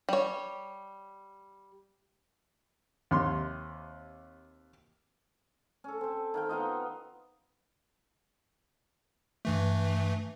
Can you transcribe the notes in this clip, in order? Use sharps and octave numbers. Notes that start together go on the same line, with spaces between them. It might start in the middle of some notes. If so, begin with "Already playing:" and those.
G3 C#5
D#2 C3 C6
C#4 A4
C4 C5
D#3 F5 G5
B3 D#4 F4 D#5
G2 E3 A3